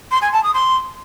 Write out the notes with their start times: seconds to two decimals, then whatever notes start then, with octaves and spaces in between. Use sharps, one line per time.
0.11 C6
0.22 G#5
0.32 A5
0.43 D#6
0.54 C6